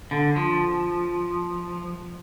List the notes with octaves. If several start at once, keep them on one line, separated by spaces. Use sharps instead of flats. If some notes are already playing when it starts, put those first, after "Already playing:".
D3
F3